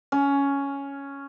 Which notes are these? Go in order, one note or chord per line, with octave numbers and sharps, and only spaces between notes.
C#4